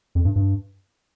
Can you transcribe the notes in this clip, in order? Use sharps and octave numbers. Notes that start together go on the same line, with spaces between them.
F2
G2
G2